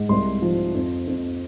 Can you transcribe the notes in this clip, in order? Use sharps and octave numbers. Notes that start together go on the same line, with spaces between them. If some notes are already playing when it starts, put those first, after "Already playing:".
Already playing: G#2
C2 C6
F3
F2
F2